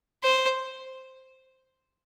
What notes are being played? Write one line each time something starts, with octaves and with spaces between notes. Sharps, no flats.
C5